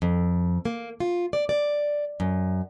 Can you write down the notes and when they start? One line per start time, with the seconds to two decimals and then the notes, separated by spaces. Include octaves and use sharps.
0.02 F2
0.65 A#3
1.00 F4
1.33 D5
1.49 D5
2.20 F#2